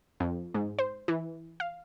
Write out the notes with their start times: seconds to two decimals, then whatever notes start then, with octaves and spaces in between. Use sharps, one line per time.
0.20 F2
0.54 G#2
0.79 C5
1.08 E3
1.60 F5